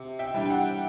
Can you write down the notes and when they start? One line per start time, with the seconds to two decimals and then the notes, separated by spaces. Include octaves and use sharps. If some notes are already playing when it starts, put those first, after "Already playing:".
Already playing: C3
0.19 E5 G5
0.34 E3 G3 D4
0.46 G5
0.50 F#5